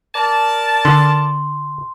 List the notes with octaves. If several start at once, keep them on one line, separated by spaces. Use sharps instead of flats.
A#4 D5 A5
D3 C6